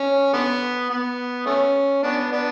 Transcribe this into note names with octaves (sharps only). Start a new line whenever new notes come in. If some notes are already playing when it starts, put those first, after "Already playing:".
Already playing: C#4
D3 B3
B3
A3 C#4
B3 D4
B3 D4